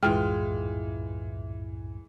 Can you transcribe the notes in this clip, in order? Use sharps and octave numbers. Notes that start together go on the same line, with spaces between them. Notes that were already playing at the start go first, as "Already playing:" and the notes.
C2 F#2 A2 E3 G#3 F4 G5 F6